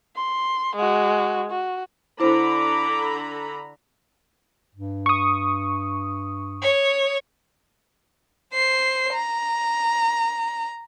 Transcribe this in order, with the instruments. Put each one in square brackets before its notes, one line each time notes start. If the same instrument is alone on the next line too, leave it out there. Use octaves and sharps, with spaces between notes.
[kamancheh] C6
G#3 F#4
F#4
[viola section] D3 A#5 B5 [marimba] E4 C5 [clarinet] D6
[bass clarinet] G2
[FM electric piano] C#6 D#6
[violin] C#5
C5 C7
A#5